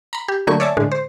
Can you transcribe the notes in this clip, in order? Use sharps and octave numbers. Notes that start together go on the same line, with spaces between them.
A#5 B5
G4
D3 F#3 A3 A#3 C#6
C#5 D5 E5 G#5 A5
A2 D3 G#3
C5